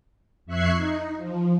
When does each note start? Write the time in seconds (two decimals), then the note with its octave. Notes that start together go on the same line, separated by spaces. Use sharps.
0.46 F2 E5 C#6 F#6 G#6 C7
0.76 D#4
1.17 F3